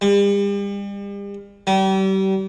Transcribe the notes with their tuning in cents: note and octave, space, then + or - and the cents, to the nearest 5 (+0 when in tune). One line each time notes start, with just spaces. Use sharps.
G3 +40
G3 -35